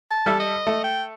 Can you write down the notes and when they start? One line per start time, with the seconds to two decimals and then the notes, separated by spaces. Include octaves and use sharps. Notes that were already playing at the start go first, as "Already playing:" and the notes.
0.11 A5
0.26 G3 A4 E5
0.40 D#5
0.67 A3
0.84 G5